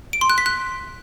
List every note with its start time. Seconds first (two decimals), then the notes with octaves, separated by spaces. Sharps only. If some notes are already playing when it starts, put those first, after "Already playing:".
0.13 D7
0.21 C6
0.30 F#6
0.38 B6
0.46 F#6